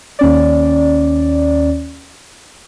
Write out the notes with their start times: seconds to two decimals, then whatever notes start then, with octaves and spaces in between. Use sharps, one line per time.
0.19 D#2 C#4 D5